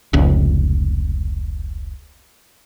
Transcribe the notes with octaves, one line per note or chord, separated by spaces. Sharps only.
F1 C#2